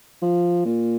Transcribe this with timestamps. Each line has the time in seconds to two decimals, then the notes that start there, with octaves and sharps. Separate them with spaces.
0.22 F3
0.65 A#2